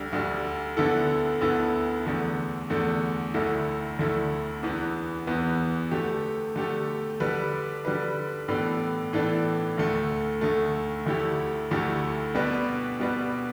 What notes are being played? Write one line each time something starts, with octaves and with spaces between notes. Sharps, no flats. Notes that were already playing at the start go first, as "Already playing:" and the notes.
Already playing: D2 D3 G3
D2 D3 G3
D2 D3 B3 E4 A4
D2 D3 B3 E4 A4
E2 D3 A3
E2 D3 A3
D2 D3 A3 E4
D2 D3 A3 E4
E2 E3 B3
E2 E3 B3
D3 A3 G4
D3 A3 G4
D3 G3 D4 B4
D3 G3 D4 B4
A2 E3 B3 D4 A4
A2 E3 B3 D4 A4
D2 D3 A3
D2 D3 A3
D2 D3 A3 E4 G4
D2 D3 A3 E4 G4
B2 G3 D4 B4
B2 G3 D4 B4